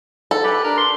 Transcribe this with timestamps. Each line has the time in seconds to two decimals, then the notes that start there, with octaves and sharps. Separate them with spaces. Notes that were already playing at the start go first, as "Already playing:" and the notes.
0.31 A4
0.44 G4 B4
0.64 D4 A#4
0.77 C6